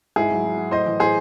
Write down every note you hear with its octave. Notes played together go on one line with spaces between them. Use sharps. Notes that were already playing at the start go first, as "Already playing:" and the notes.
G#2 E4 G#4
F#3
F#3
F#3
A2 C5 D#5
E3
A2 G#4 C5